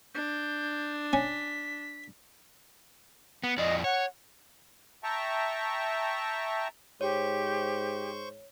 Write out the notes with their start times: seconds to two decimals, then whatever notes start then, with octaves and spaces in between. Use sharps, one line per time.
0.14 D4 G6
1.13 C#4 B6
3.44 B3
3.58 F2 D5 D#5
3.84 C#5 F#5
5.04 E5 G5 A5 A#5 C#6
7.01 G#2 G4 C5 C#5 C#6 G6